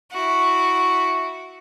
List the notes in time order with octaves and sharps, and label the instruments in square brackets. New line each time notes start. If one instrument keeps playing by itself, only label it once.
[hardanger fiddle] E4 F#4